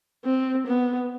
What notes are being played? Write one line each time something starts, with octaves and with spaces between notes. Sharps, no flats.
C4
B3